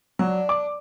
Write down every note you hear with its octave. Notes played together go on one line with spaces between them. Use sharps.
F#3 D4
D6